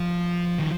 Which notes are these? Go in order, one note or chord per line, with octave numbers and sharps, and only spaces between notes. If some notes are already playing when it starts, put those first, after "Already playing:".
Already playing: F3
D#3